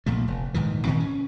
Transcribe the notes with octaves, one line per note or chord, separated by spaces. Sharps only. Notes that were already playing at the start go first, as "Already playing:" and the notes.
B1 A#2 F3 A3
F1
A#1 G#2 D#3 E3
A#2 D#3 C4
C#4